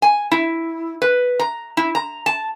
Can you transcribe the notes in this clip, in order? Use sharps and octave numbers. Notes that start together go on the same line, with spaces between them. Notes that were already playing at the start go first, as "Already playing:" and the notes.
G#5
E4
B4
A#5
E4
A#5
A5